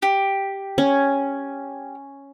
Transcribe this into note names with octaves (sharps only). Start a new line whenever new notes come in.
G4
C#4